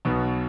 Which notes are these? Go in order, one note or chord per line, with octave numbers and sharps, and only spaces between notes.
B1 B2 B3